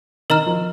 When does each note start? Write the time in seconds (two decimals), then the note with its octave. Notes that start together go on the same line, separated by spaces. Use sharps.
0.30 D#3 A#4 D#5 A#5 F6
0.46 F3